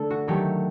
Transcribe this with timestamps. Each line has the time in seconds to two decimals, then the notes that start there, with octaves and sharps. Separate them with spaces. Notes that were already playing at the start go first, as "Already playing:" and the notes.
Already playing: D3 A3 A4
0.10 F#4
0.28 D#3 F#3 A3 G4